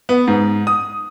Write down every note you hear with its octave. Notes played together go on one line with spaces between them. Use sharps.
B3
G#2
D#6